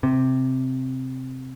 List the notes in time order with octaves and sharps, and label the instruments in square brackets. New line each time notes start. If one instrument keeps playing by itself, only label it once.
[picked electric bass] C3